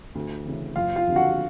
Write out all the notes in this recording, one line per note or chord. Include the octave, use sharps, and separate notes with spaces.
D2
C#3 E3
F#1 F4 F5
F4 F5
F2 D3
F#4 F#5